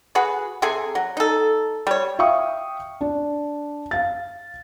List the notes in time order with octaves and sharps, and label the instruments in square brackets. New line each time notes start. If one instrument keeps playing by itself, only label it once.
[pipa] F#4 G#4 B4
C3 G#4 A4 G#5
F#3
D#4 A4
G3 C#5
[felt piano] E5 F5 G5 C#6 D#6
D4
F5 A6